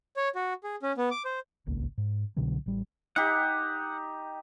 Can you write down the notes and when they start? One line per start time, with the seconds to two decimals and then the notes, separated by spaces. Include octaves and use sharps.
0.17 C#5
0.35 F#4
0.64 G#4
0.83 C#4
0.98 B3
1.11 D6
1.25 C5
1.66 D#1 G#1 C#2 A#3
1.98 G#2
2.36 C2 B2 D3 F#3
2.66 A1 G3
3.16 D#4 G4 F#5